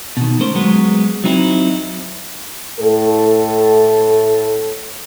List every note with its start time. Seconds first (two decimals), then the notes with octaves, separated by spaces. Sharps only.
0.17 B2 D#3
0.40 A3 C#4 A#4 C5
0.55 F#3 G#3 B3
1.24 F#3 C4 D#4 E4
2.79 A2 A4